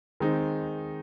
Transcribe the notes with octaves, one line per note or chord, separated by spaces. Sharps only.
D#3 G#3 C4 D#4